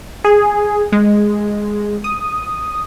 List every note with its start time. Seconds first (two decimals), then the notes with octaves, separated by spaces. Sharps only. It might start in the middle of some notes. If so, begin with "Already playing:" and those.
0.24 G#4
0.92 G#3
2.04 D#6